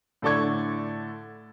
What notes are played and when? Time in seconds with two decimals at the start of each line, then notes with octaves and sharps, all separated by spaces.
0.22 A2 D3 A4 D5 C#6 G#6